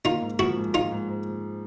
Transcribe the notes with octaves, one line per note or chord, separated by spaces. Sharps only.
A#3 D#4 F4
G#2
F3 E4 F#4
G#2
G#2 D#4 F4
G#2
G#2